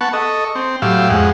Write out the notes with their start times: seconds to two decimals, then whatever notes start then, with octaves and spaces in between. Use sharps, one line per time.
0.01 B3 F#5 A5 C#6
0.13 A4 D#5 C#6
0.55 C4
0.82 A2 F#3 G4 F5 E6
1.10 F2 G#3 F#5